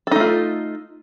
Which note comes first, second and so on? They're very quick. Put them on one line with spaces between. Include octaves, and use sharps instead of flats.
A4 D#4 A3 F4